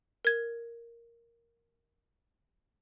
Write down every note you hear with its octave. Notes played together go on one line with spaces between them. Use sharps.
A#4 G#6